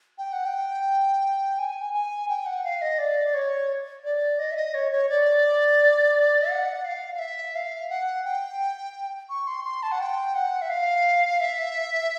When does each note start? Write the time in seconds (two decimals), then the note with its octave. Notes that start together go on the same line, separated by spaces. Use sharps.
0.18 G5
0.33 F#5
0.46 G5
1.58 G#5
1.94 G#5
2.29 G5
2.46 F#5
2.64 F5
2.82 D#5
2.98 D5
3.34 C#5
4.04 D5
4.39 D#5
4.52 E5
4.56 D#5
4.74 C#5
4.92 C#5
5.09 D5
6.50 F#5
6.85 F5
7.15 F5
7.19 E5
7.55 F5
7.90 F#5
8.25 G5
9.30 C#6
9.47 C6
9.65 C6
9.83 A5
9.92 F#5
10.01 G5
10.35 F#5
10.62 E5
10.70 F5
11.40 E5